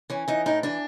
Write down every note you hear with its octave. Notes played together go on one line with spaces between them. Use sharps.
E3 C#4
E3 D#4
A2 D#4
E3 D4